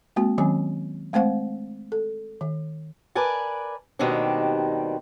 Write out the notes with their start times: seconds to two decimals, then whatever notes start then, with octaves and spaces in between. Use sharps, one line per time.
0.16 G#3 A#3 C4 F#4
0.38 D#3 F#3 C4 C#4 G#5
1.13 G#3 A3 C4 C5 F5 F#5
1.92 A4
2.41 D#3
3.15 A#4 B4 D5 G#5 A5
3.99 D#2 B2 D#3 G3 C4 D4